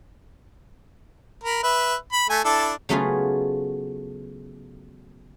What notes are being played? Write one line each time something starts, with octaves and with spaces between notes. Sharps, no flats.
A#4 B5
B4 E5
B5
A3 G#5
D4 E4 A4
C#3 F#3 A3 B3 F4 G#4